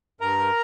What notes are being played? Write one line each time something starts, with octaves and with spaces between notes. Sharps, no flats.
G2 A#4 A#5